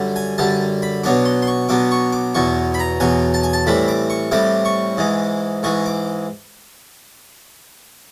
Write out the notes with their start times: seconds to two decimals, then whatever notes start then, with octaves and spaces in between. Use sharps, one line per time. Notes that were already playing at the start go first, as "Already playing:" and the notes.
Already playing: F#2 D3 G3
0.16 G#5
0.38 F#2 D3 G3 A5
0.82 B5
1.04 B2 F#3 B3 D4 D6
1.25 C6
1.42 C6
1.47 C#6
1.69 B2 F#3 B3 D4 D6
1.91 C#6
2.13 D6
2.35 E2 B2 F#3 C#6
2.74 B5
2.79 A#5
3.00 E2 B2 F#3 G#5
3.34 A5
3.43 G#5
3.53 A5
3.66 A2 E3 G3 C4 B5
3.88 D6
4.10 C#6
4.31 A2 E3 G3 C4 D6
4.65 C#6
4.97 G#2 E3 G#3
5.63 G#2 E3 G#3 C#6
5.86 D6